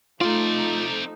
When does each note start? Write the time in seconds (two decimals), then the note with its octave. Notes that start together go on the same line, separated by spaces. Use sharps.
0.21 F3 A3 C4 D#4 F4 D5